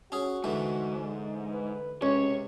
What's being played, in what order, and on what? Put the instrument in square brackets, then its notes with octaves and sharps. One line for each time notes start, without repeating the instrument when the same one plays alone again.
[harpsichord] C#4 G#4 [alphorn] F#4
[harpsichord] D2 E3 [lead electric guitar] G#2
[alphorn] B4
[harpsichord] C#2 [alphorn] C3 [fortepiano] C#4 [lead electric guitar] C#5